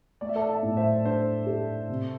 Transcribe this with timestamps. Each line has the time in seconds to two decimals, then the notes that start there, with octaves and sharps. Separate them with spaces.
0.21 A3 D5
0.29 E5
0.36 A4 D5
0.49 E5 A5
0.63 A2
0.77 C5 E5
1.05 D4 C5
1.47 A4
1.89 C3